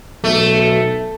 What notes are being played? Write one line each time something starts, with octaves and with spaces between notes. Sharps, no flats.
B1 A3